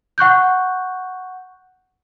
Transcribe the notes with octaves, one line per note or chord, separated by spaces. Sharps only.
F#5 C#6 F#6 G6